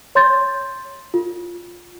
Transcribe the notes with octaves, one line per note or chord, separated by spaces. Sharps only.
C#5 C6 G6 A6
F4